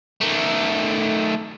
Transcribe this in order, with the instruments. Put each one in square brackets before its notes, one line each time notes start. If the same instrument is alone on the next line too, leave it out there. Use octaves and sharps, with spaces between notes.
[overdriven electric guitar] D#3 A3